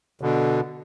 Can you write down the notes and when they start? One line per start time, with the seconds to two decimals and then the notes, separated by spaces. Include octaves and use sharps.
0.21 B2 D3